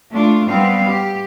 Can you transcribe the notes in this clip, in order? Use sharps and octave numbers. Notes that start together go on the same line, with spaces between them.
A3 D4 F4
G3 B3 C4 F5
G4